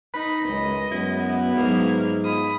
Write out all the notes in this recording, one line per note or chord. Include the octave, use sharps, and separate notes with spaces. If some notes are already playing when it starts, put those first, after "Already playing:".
D#4 B5
C#2 F#2 G#3 B4 D#5
F#2 B3 E4
G#2 F#3 A#3 F6
G#3 B3 F4 B5 D#6